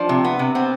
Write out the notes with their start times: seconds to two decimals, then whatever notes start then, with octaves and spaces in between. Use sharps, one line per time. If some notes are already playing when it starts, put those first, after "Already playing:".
Already playing: F3 D4
0.09 C3
0.24 B3
0.39 C3
0.55 B3 C4